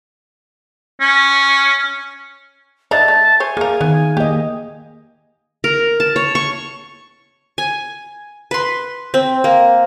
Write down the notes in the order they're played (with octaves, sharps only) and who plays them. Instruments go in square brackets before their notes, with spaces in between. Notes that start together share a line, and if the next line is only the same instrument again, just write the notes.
[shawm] C#4
[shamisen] D3 D4 D#4 [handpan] E5 [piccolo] A5
[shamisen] A3
[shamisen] C5 C#5 [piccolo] G#5
[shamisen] A#3 A#4 [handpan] G#4 F5
[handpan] D#3 [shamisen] B3
[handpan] A#3 D#5 [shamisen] G4
[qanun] A#4
A5
C#5
C#6
G#5
B4 C6
C4
A#3